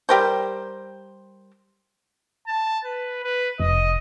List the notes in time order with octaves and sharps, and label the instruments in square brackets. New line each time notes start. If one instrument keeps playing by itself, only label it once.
[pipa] G3 G4 A#4 C5
[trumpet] A5
B4
B4
[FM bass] F1 [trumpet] D#5